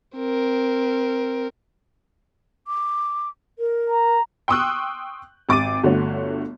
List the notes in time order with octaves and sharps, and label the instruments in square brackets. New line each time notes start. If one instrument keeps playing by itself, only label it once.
[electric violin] C4 A#4
[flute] D6
A#4
[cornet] A#5
[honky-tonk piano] G5 C6 C#6 D#6 E6 F#6
G#1 D6 A6 D#7
G1 D3 A3 F#4 C#5